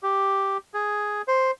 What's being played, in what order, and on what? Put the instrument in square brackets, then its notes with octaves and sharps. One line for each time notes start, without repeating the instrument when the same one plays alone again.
[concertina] G4
G#4
C5